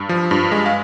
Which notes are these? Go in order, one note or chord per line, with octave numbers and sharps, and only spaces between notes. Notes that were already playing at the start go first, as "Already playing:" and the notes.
Already playing: G2
F3
G2
G#3
F5